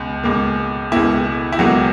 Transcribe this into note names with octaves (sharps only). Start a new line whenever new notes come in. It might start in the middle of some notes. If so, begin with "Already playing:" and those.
Already playing: C#2 B2
C#2 B2 A#3
C#2 B2 A#3 E4
E4
C#2 B2 F#3 A#3 F#4